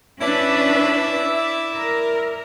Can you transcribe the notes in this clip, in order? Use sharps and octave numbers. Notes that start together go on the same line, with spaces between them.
C#4 D4 E4 B4 D5 E5
A#4